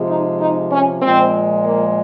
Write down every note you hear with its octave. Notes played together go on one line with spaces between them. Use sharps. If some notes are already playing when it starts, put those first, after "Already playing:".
Already playing: C3 F3 G#3
D#4
D#4
C#4
A#2 F3 G#3 C4
A#3